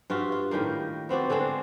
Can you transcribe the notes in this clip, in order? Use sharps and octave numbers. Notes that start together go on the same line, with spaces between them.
G2 F4 F#4 E5
F4
A2 D#3 G3 A#3
B3 C4 F#4 D5
D3 G#3 C4 D4